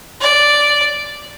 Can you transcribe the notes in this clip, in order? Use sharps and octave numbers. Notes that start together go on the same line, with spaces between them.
D5